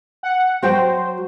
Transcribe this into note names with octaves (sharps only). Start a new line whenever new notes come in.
F#5
F#3 F#4 C5 G5